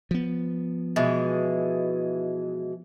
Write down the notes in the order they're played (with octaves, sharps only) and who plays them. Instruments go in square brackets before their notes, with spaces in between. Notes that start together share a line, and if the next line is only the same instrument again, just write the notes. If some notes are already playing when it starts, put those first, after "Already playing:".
[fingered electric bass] F3 B3
[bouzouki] B2 E3 G#3